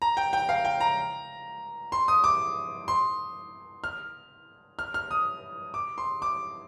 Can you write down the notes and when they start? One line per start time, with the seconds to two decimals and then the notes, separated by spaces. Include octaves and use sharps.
0.02 A#5
0.17 G5
0.33 G5
0.49 F5
0.65 G5
0.80 A#5
1.92 C6
2.08 D#6
2.24 D6
2.88 C6
3.84 F6
4.79 F6
4.94 F6
5.11 D#6
5.74 D6
5.98 C6
6.22 D6